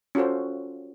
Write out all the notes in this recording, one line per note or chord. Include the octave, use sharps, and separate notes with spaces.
C#4 F4 F#4 A4 C5